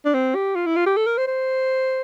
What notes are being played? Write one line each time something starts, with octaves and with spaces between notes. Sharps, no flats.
D4
C4
G4
F4
E4
F4
G4
A4
A#4
C5
C5